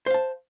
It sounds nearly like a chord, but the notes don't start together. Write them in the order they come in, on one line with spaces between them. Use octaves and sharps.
C5 F5 A5